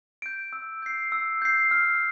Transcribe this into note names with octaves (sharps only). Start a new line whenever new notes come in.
G6 D7
E6
G6 C7
E6
G6 C7
F6